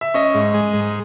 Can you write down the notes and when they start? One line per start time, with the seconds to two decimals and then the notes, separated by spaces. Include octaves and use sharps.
0.01 E5
0.14 C#4 D#5
0.34 G#2
0.54 G#3
0.74 G#2